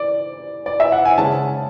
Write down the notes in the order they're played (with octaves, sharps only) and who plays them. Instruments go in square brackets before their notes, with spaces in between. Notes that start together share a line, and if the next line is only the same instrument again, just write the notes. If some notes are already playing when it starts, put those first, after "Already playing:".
Already playing: [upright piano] D5
D5
E5
F#5
G#5
C#3 G#3 C#4 A5